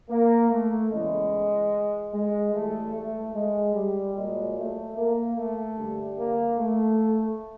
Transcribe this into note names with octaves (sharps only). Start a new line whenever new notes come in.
A#3
A3
E2 C#3 E3 G#3
G#3
A2 E3 G3 A3
A3
G#3
G3
A#2 F#3 G#3
A3
A#3
A3
G2 D3 G3
A#3
A3